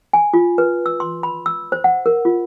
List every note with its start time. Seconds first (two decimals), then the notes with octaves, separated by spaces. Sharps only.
0.13 G#5
0.34 F4
0.58 B4
0.86 E6
1.00 C6
1.23 B5
1.46 E6
1.72 C5
1.84 F#5
2.06 A#4
2.25 F4